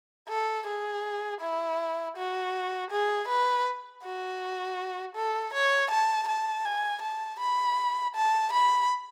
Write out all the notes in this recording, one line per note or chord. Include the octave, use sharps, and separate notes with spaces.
A4
G#4
E4
F#4
G#4
B4
F#4
A4
C#5
A5
A5
G#5
A5
B5
A5
B5